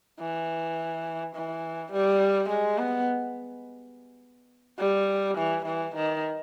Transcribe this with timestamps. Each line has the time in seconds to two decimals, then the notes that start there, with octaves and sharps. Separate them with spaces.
0.20 E3
1.35 E3
1.92 G3
2.49 G#3
2.78 B3
4.79 G3
5.37 E3
5.65 E3
5.95 D#3